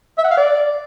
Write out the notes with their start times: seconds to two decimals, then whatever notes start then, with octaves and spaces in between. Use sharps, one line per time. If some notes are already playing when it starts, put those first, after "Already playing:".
0.18 E5
0.24 F#5
0.31 F5
0.37 D5